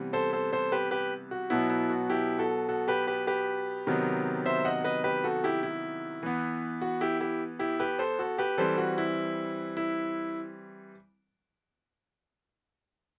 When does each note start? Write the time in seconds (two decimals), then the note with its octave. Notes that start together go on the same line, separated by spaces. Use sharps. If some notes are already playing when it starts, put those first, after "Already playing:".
Already playing: C3 E3 G3 B3
0.13 A4 C5
0.33 A4 C5
0.53 A4 C5
0.72 G4 B4
0.91 G4 B4
1.31 F#4
1.50 B2 F#3 B3 E4
1.70 E4
1.90 F#4
2.10 E4 G4
2.38 F#4 A4
2.69 F#4 A4
2.88 G4 B4
3.07 G4 B4
3.27 G4 B4
3.87 C3 D#3 F#3 B3
4.46 C5 E5
4.65 D#5 F#5
4.84 B4 D#5
5.04 G4 B4
5.24 F#4 A4
5.44 E4 G4
5.63 E4
6.23 E3 B3
6.81 F#4
7.01 E4 G4
7.21 E4 G4
7.59 E4 G4
7.80 G4 B4
7.99 A4 C5
8.19 F#4 A4
8.38 G4 B4
8.58 E3 G3 C4 A4 C5
8.78 F#4
8.98 E4
9.77 E4